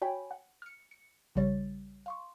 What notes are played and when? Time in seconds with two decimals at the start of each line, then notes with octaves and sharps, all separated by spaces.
0.02 F#4 C#5 G5 G#5 B5
0.31 F#5
0.62 F6 C#7
0.91 C#7
1.35 A#1 C#3 G3 C#5 A6
2.06 F5 C6 C#6